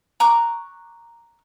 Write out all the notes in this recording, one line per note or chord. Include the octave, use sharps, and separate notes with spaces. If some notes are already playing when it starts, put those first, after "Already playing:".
A#5 C#6 D6 F#6